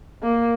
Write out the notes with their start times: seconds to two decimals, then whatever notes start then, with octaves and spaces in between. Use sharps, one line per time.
0.22 A#3